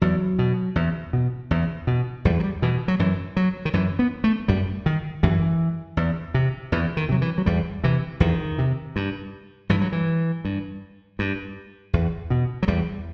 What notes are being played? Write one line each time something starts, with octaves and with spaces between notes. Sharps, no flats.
E2 F#3
B2
E2
B2
E2
B2
E2 G3
F#3
G3
B2 E3
F#3
F#2 E3
F#3
D#3
F#2 E3
B3
A3
F#2 G3
D#3
F#2 E3
E2
C3
E2 E3
D#3
C3 F#3
E3
F#3
E2 G3
C3 E3
E2 D#3
C3
G2
G2 E3
F#3
E3
G2
G2
E2
B2
F#3
E2 G3